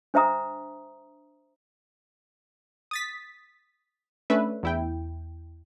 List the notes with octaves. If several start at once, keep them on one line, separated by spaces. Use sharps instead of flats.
D4 C5 E5 A#5 D#6
D#6 A6 B6
A3 C#4 D4 B4 E5
E2 E4 G5